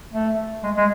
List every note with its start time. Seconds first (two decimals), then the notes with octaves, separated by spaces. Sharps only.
0.13 A3
0.64 G#3
0.77 G#3